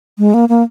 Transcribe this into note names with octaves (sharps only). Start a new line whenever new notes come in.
G#3
A#3
A#3